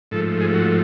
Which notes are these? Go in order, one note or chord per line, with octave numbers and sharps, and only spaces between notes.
G#2 F3 A3 A4
G#4
F#4